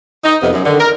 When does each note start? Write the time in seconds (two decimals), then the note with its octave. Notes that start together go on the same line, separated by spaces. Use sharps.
0.24 D#4
0.41 F2 C3 B3
0.52 F#2
0.65 D3 D#3
0.79 A#4